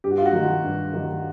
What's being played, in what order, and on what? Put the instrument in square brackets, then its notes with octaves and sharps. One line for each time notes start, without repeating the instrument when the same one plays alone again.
[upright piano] G2 G4
F#4
F4
F#4
D#3 F#3
G2
D#3 F#3